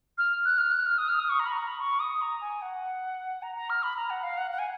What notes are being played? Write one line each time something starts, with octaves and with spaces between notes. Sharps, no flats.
F6
F#6
F6
F#6
F6
D#6
F6
D#6
C#6
A#5
B5
A#5
B5
C#6
D#6
A#5
G#5
F#5
A#5
A#5
F6
B5
A#5
F#5
F5
F#5
F#5
G#5